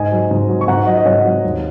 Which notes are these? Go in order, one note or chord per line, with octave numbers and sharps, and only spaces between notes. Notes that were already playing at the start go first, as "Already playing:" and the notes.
Already playing: G#2 D#5 G#5
F#3
G#2
F#3
C#6
G#2 F#5 A#5
F#3 D#5
D#5
G#2 C#5 F#5
F#3
D#2